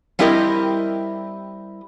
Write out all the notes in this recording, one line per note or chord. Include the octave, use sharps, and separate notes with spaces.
G3 C4 E4 G4 A#4 D#5